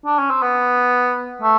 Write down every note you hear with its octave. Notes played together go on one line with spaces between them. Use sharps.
D4
C#4
C4
B3
A3